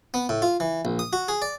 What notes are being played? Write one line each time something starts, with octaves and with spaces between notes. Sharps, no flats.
B3
A2
F4
E3
A#1
D#6
F#4
G#4
D5